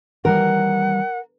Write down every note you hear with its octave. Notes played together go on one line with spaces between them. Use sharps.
D#3 E3 G3 A#4 F#5